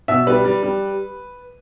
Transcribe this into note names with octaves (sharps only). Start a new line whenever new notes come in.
B2 E5
G3 B4
G3
G3